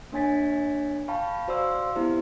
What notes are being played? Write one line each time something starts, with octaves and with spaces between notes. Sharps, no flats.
A#3 D4 C#5 G#5 A6 B6
F5 G5 A5 B5 C#6
F#4 C5 D5 F5 C6 E6
B3 E4 G4 C5